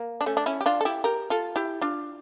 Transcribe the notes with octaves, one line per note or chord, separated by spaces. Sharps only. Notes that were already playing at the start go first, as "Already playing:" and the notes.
Already playing: A#3
D4
A3 C#4
D4
C#4 E4
G4
D4 F4
A4
E4 G4
G4 A#4
F4 A4
E4 G4
D4 F4